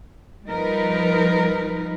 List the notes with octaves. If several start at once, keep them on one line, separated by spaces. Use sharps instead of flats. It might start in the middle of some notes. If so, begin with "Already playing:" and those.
F3 G3 D#4 A#4 B4